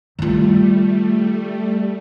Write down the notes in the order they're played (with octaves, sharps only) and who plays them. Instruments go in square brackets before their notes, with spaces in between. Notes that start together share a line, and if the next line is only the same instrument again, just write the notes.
[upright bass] D#3 F4 [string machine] G3 A3